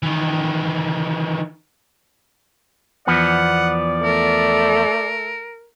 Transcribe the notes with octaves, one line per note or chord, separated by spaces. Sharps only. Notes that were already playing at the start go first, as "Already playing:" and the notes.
D#3 E3
E2 F3 B3 D5 F#5
A3 A#4